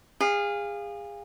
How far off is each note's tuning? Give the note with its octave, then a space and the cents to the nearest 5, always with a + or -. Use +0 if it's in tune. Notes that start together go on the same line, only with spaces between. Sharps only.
G#4 -30 F5 +0